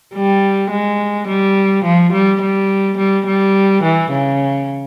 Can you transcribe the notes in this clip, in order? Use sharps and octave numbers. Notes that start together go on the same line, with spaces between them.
G3
G#3
G3
F3
G3
G3
G3
G3
E3
C#3